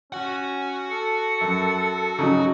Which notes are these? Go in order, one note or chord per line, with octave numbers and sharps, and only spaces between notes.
C#4 F#4 F#5
A4 C#7
F#2
C#3 F#3 D#4